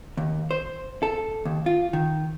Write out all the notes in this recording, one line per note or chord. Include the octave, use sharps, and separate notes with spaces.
D#2
C5
A4
D#2
F4
D#3